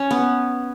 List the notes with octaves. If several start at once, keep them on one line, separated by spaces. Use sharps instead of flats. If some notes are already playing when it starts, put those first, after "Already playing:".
Already playing: C#4
B3